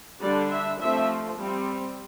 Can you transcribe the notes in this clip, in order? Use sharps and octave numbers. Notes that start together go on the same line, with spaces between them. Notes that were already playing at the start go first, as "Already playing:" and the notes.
D3 G3 D4 D5
E5
F3 A3 C4 E5
G3 C4